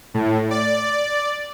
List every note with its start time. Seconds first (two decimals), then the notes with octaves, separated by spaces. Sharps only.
0.14 A2
0.51 D5